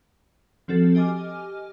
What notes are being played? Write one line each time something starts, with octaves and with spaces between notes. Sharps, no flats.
F3 C4 F#4 A4 A6
G4 D#5 G#5 D6 F6